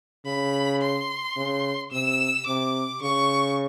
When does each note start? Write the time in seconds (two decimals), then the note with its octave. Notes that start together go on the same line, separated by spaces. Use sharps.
0.26 C#3 B5
0.81 C6
1.36 C#3
1.92 C3 E6
2.47 C3 D6
3.02 C#3 C#6